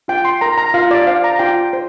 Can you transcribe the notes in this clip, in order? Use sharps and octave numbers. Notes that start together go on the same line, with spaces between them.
F4 G5
C6
A#4 A#5
A#5
F4 F5
D5
C5 F5
A#5
F4 G5
C5